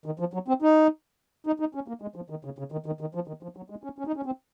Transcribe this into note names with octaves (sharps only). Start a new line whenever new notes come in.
D#3
F3
F#3
C4
D#4
D#4
D#4
C#4
A#3
G#3
F3
D#3
C#3
C#3
D#3
D#3
D#3
F3
D#3
F3
F#3
G#3
C#4
C#4
D#4
C#4
C4